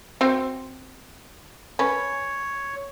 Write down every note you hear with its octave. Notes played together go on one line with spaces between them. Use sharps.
C4 F#4 C5
C#4 B4 C#5